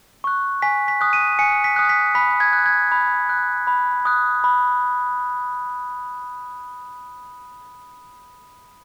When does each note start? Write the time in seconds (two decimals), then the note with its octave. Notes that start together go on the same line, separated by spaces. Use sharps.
0.24 C#6 F#6
0.62 G#5 B6
0.88 B6
1.01 D#6 F#6
1.13 D#7
1.39 G#5 C#7
1.64 B6
1.76 D#6 F#6
1.89 B6
2.15 B5 B6
2.40 G#6
2.53 F#6
2.66 G#6
2.92 B5
3.29 F#6
3.67 B5
4.05 D#6 F#6
4.44 B5